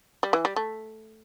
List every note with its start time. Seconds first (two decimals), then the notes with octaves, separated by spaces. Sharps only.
0.23 G3
0.33 E3
0.45 G3
0.56 A3